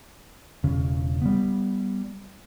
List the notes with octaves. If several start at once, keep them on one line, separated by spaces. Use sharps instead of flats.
E1 C#3
G3 B3